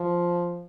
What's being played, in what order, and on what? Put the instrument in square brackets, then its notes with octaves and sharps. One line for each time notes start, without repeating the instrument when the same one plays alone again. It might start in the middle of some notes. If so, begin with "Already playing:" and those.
Already playing: [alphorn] F3